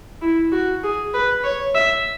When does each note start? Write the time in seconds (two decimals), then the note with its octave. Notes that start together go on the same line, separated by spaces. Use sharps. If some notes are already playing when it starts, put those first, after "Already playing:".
0.22 E4
0.52 F#4
0.83 G#4
1.14 B4
1.44 C#5
1.75 E5